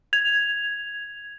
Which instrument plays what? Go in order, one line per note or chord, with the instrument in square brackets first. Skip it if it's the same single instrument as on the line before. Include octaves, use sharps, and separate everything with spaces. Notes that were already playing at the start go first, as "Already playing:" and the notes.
[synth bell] G#6 F7